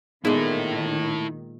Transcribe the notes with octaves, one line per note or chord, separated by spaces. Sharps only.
A#2 D#3 G#3 B3 D#4 E4 G#4 A4